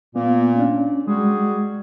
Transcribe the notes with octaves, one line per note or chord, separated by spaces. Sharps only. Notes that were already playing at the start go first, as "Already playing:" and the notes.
A#2 A#3 B3
C#4 D4
G3 G#3 F#4 G#4